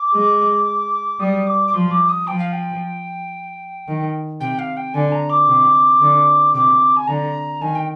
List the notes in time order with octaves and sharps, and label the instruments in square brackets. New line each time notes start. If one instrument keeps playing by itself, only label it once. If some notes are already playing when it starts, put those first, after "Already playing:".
Already playing: [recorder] D6
[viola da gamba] G#3
[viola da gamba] G3 [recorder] D#6
[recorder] D6
D6
[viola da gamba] F3 [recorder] C6
[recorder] D6
D#6
[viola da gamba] F3 [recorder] G5
[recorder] F5
G5
[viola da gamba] D#3
[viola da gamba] C3 [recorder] G5
[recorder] F5
G5
[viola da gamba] D3 [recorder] G#5
[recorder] A#5
D6
[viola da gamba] C3
D3
[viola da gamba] C3 [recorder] D6
[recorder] G#5
[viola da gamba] D3 [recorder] A#5
[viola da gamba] D#3 [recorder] G#5
[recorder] G5